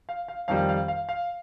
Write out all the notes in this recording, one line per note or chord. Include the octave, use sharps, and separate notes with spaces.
F5
F5
F2 D#3 G3 F5
F5
F5
F5